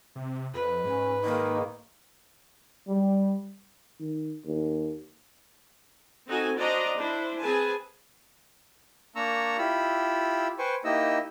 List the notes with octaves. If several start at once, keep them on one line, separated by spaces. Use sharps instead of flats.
C3
F2 B4
G#2 C#4
D#3 A#3
G3
D#3
D#2
C4 D#4 F#4 A4 G#5
D4 F#4 C5 D5 D#5 A#5
D4 E4 C5
C4 G#4 B4 G#5 A5
A#3 D4 A#5 C#6 E6
E4 F4 G4 B5 E6
B4 C5 G5 G#5 C#6
A#3 D#4 E4 G4 D#5 E6